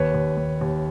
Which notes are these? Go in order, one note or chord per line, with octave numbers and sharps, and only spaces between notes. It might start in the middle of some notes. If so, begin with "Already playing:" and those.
Already playing: D#2 B4 C#5
D#2
D#2
D#2